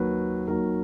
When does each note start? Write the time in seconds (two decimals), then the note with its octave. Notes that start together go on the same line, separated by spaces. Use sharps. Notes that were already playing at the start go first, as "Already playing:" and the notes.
Already playing: D#2 D#3 F#3 B4
0.48 D#2 D#3 F#3 A#4